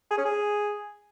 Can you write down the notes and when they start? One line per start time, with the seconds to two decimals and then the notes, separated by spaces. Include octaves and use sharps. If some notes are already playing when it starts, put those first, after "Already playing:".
0.11 G#4
0.18 C#4
0.25 G#4